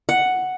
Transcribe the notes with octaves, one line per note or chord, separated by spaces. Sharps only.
F#5